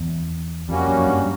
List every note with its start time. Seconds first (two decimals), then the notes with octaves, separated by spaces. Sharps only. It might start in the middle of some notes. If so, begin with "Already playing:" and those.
Already playing: E2
0.69 F2 G3 A#3 C#4 F#4
0.88 F#2
1.07 G2